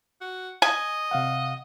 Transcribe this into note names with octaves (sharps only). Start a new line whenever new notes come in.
F#4
D#5 G#5
C3 F5 F#5